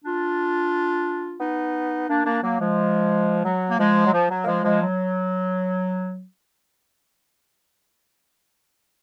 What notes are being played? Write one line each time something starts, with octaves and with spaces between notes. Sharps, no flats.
D4 F4
B3 D#4
A#3 D4
A#3 D4
F#3 A#3
F3 G#3
F#3
A#3
F3 G#3
F#3
F3
F#3
A#3
F3 G#3
F3 G#3
F#3